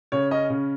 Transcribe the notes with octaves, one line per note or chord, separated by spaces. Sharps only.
C#3 C#5
C#4 D#5
C#3